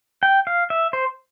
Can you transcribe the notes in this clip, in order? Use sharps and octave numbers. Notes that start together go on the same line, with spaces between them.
G5
F5
E5
C5